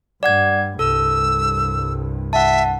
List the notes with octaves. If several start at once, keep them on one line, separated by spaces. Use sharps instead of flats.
G2 G3 D5 F#5 G#6
C2 G2 A4 E6
E5 F#5 A5